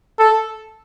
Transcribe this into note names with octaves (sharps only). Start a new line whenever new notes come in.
A4